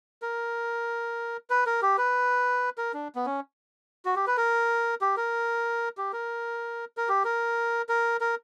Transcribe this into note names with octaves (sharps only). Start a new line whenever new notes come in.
A#4
B4
A#4
G4
B4
A#4
D4
B3
C#4
F#4
G4
B4
A#4
G4
A#4
G4
A#4
A#4
G4
A#4
A#4
A#4